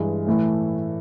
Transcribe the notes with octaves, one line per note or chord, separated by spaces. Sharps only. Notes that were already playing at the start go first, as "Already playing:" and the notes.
Already playing: G2 E3 G#3
A2 E3 A3